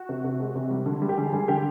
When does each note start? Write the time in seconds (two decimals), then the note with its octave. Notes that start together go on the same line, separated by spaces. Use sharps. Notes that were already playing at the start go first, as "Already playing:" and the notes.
Already playing: F#4
0.09 C3
0.24 C3
0.40 G#3
0.55 C3
0.71 G3
0.86 D3
1.02 G3
1.09 G4
1.17 D3 G#4
1.33 G3 G#4
1.48 D3 G4